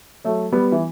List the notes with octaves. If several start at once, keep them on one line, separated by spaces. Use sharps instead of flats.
F#3 A3
G3 B3
E3